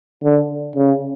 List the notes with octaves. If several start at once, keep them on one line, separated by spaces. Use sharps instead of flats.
D3
C#3